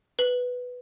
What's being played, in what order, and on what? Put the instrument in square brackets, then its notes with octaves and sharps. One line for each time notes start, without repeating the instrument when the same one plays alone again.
[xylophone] B4 F#7